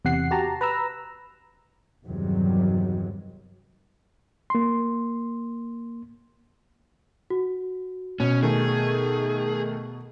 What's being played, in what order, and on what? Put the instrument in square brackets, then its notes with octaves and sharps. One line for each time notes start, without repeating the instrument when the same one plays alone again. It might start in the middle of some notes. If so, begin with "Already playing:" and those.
[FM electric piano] E2 C3 F#5 C7
F#4 G4 A5 A#5
B4 A#5 E6
[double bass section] E2 G2 C3 D#3 F#3 G3
[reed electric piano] A#3 C6
[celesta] F#4
[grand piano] B2 [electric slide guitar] C#4
[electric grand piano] D#3 A3 [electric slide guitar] G#4